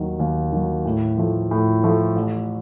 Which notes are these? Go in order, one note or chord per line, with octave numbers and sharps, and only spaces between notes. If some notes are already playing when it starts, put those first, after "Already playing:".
Already playing: D#2 D#3 F#3
D#2
D#3 F#3
A2
F3 A3
A2
F3 A3
A1